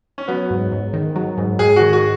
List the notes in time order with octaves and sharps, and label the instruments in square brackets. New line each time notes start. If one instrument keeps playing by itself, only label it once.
[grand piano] C#4
[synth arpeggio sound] F#3 [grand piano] B3
[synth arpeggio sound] G#2
G#2
D#3
F#3
G#2
[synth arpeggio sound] G#2 [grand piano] G#4
[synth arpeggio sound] D#3 [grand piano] F#4
[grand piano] F#4